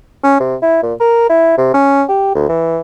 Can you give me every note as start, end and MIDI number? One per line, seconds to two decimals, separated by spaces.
0.24 0.39 61
0.40 0.55 48
0.62 0.80 64
0.83 0.94 46
1.00 1.25 70
1.30 1.55 64
1.58 1.73 48
1.74 2.03 61
2.09 2.34 67
2.35 2.45 38
2.49 2.80 52